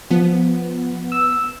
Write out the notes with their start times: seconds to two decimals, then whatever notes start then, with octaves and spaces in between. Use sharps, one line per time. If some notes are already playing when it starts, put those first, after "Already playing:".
0.11 F3 B3
1.12 E6